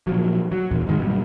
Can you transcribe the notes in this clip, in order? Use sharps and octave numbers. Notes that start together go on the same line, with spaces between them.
A#2 F3 F#3
F#3
E2 A#2
G#2 D#3 G#3
G2 B2 F#3 G3